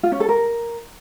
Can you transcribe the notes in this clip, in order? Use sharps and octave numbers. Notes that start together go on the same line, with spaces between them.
F4
C#4
A4
A#4